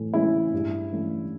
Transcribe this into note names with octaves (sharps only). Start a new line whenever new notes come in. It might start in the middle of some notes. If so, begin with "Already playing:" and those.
Already playing: A2 E3
E3 G#3 C#4 E4
G2
E3 A3 C#4